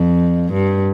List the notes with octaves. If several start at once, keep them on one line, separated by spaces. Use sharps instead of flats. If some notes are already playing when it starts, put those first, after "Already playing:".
Already playing: F2
G2